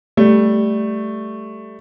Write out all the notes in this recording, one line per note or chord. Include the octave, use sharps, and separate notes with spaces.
G3 A3